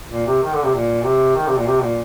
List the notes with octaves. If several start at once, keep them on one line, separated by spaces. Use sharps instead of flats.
A#2
C3
D#3
D3
C3
A#2
C3
D#3
C3
A#2
C3
A#2